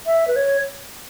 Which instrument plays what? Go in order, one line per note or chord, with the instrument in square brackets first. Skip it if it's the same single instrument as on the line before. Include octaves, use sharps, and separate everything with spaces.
[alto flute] E5
B4
C#5